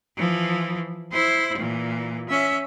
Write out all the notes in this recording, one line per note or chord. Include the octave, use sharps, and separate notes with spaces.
E3 F3
E4 C5
A#2 E3
C#4 E5